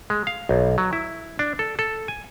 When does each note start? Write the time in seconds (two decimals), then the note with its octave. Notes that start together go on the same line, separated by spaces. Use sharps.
0.10 G#3
0.27 F5
0.49 B1
0.78 F#3
0.93 E4
1.39 D4
1.59 A4
1.79 A4
2.08 G#5